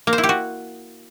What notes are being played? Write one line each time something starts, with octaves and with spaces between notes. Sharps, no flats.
A#3
C5
E4
G4
F#4